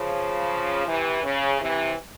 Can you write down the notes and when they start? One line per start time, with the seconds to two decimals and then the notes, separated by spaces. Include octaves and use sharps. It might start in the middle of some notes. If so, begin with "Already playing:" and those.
Already playing: C#3 F3
0.87 C3 E3
1.24 C#3
1.60 C3 E3